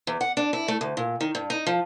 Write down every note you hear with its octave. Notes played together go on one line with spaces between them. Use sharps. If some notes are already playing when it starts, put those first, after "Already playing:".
E2
F#5
D4
E4
A3
D2
A#2
D#3
G2
D#4
F3